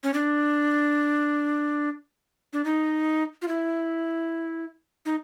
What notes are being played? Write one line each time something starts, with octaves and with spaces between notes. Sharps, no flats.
C#4
D4
D4
D#4
F4
E4
D#4